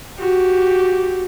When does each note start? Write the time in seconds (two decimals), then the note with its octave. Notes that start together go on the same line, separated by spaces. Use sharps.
0.18 F#4 G4